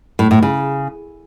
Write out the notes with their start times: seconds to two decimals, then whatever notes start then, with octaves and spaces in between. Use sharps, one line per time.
0.19 A2
0.31 A2
0.43 C#3